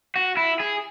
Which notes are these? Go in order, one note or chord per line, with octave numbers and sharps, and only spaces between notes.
F#4
E4
G#4